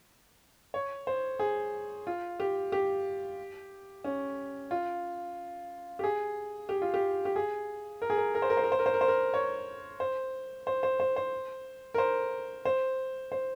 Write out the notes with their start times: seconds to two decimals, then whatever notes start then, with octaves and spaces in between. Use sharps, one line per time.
0.74 C#5
1.07 C5
1.39 G#4
2.07 F4
2.40 G4
2.72 G4
4.04 C#4
4.71 F4
5.99 G4
6.04 G#4
6.69 G4
6.82 F4
6.94 G4
7.25 G4
7.36 G#4
8.02 A#4
8.10 G#4
8.18 A#4
8.35 A#4
8.42 C5
8.50 A#4
8.57 C5
8.64 A#4
8.72 C5
8.79 A#4
8.86 C5
8.94 A#4
9.01 C5
9.08 A#4
9.34 C#5
10.00 C5
10.67 C5
10.83 C5
11.00 C5
11.16 C5
11.94 A#4
11.98 C5
12.65 C5
13.32 C5